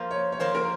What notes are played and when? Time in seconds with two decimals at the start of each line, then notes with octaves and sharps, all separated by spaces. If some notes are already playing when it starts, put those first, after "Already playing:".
Already playing: F3 A#3 F4
0.11 C#5
0.32 C#5
0.39 F3 A#3 F4 C5
0.55 A#4